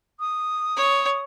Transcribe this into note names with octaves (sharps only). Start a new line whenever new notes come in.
D#6
C#5